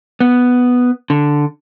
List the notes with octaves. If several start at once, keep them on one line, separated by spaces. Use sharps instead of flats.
B3
D3